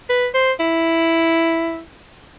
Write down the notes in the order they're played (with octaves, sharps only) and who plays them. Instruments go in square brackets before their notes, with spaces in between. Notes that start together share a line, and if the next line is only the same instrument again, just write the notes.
[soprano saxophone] B4
C5
E4